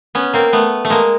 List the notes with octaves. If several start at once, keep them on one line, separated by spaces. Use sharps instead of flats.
B3 C#4
A#3 C4
A3 B3
A3
G#3 A#3